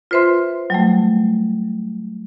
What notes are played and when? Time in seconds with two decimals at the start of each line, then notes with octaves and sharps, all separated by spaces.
0.11 F4 B4 C5 E5 C6
0.70 F#3 G3 A3